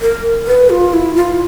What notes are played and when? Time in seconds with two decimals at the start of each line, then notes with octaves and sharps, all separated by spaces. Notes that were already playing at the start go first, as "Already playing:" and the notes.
0.01 A#4
0.47 B4
0.70 F4
0.93 E4
1.16 F4